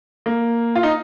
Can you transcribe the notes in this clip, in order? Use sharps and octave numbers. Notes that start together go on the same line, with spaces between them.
A#3
F4
D#4